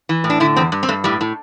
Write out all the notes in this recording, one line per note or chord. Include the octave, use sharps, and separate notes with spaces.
E3
A2
D4
D3 E4
E2 C4
G2
C4
G2 A3
A2 G3
A2